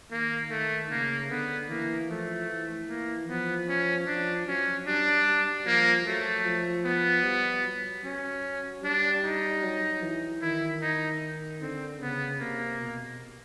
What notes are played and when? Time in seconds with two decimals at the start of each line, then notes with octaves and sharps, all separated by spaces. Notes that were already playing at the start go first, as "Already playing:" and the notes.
0.11 D#3 A#3
0.50 D#3 A3
0.90 C#3 A#3
1.30 D3 B3
1.69 E3 A#3
2.09 F3 A3
2.49 E3
2.88 A#3
3.28 F3 B3
3.68 C#4
4.07 F3 D4
4.47 F#3 C#4
4.87 G3 D4
5.26 G3
5.66 F3 A#3
6.06 F#3 A3
6.45 F3
6.85 B3
7.25 G3
7.64 F#3
8.04 F#3 C#4
8.83 G3 D4
9.23 D#4
9.63 F#3
10.02 E3
10.41 D#3 E4
10.82 D#4
11.61 D3 C4
12.00 C#3 B3
12.40 C3 A#3
12.80 B2